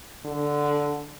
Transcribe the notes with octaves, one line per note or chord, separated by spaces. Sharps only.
D3